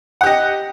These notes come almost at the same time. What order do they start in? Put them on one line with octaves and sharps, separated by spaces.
F#5 G4 D#5